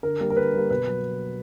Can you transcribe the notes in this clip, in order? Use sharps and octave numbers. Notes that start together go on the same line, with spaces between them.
D3 A#4
G3 A#3
A#4
D3 B4
G3 A#3
B2 B4
F#3